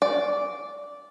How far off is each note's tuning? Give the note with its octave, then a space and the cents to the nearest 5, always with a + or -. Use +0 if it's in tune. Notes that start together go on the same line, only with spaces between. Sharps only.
D5 -10